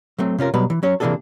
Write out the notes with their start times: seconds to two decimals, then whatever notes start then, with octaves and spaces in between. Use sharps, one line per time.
0.18 F#3 A3 C4
0.38 C3 C#4 F4 A#4
0.54 B2 F#3 G3 B4
0.70 E3
0.83 F#3 C#4 C#5
1.00 C3 E3 A#3 D4 G#4 A4